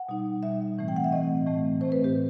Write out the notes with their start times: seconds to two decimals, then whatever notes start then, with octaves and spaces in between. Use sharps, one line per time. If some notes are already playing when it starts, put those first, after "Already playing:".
Already playing: F#5
0.09 B2 G3 D#4
0.43 B2 G3 D#4 E5
0.78 A2 E3 A3 C4
0.88 G5
0.96 F#5
1.04 E5
1.12 A2 E3 A3 C4 D#5
1.46 A2 E3 A3 C4
1.81 A2 E3 A3 C4 C5
1.92 B4
2.04 G4